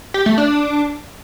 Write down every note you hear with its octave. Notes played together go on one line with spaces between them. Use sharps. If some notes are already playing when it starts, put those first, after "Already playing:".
G4
A3
D4